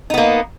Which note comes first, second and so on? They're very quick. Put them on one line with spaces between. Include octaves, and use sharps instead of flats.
D#4 B3 A#3